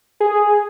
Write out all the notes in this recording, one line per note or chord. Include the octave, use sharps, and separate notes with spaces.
G#4